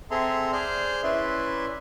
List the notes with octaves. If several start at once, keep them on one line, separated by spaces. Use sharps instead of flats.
C4 G#4 A4 E5 A#5 C6
G#4 C5 D5 F6 G6
C#4 E4 B4 D5 E5 C6